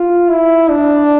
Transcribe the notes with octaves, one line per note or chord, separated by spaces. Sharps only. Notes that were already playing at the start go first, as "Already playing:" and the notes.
Already playing: F4
E4
D4